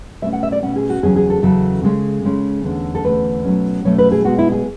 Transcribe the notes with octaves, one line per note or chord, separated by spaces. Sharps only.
B2 A3 C#4 E5
F#5
E5
D5
B2 A3 C#4 F#5
G#4
F#4
E2 C#3 F#3 C#4 G#4
G#4
A4
E2 C#3 F#3 C#4 A4
C#3 G#3 C#4
C#3 G#3 C#4
E2 D3 A3 C#4
A4
E2 D3 A3 C#4 B4
B2 F#3 A3 C#4
B2 F#3 A3 C#4 C#5
B4
G#4
B2 G#3 B3 F#4
E4
G#4